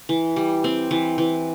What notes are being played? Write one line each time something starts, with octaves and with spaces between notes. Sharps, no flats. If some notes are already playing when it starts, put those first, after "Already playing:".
E3
G3
C4
E3
E3